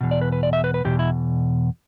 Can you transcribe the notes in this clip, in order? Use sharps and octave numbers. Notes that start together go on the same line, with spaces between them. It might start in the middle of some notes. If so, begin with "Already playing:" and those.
E2 B2
D5
B4
B4
D5
E5
B4
B4
E2 B2 G4
E4